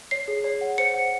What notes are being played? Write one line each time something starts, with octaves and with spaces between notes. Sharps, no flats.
C#5 C7
G#4
C#5
F#5
C5 C#7
F#5